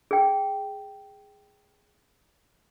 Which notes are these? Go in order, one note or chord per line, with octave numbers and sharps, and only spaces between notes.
G#4 G5